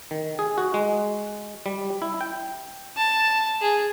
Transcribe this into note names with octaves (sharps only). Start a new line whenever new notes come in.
D#3
G#4
F#4
G#3
G3
E4
G5
A5
G#4